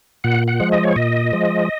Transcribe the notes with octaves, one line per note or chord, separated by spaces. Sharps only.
A#2 F#5
F#5
F3 G#3
D#5
C#5
A#2 D#5
F3 G#3